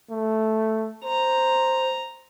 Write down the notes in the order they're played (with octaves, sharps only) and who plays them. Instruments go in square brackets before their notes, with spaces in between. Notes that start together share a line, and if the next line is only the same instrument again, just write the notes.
[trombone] A3
[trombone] C5 [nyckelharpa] A#5